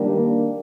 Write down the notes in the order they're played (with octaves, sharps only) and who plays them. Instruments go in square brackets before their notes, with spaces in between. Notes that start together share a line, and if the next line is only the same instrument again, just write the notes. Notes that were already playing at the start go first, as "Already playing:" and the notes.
Already playing: [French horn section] D#3 G3 A#3 D4